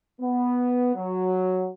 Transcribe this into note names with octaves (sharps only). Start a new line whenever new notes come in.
B3
F#3